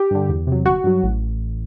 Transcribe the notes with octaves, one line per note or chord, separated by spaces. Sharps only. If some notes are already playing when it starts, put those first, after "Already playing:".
Already playing: G4
G2 D3
E2
C3 F#3
G1 F#4
G2 F#3
A1